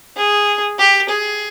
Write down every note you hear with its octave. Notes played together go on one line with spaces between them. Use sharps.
G#4
G4
G#4